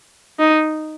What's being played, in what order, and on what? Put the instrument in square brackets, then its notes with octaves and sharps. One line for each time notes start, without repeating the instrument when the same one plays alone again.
[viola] D#4